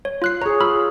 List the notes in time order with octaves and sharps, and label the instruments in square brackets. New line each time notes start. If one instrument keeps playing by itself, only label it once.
[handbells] C#5
F4 F#6 C7
[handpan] G#4 C#5 [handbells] A#5
[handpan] F4 [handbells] B5 E6 F6